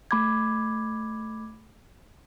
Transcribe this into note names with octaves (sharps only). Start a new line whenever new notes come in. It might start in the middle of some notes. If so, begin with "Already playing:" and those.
A3 B5 D6 G#6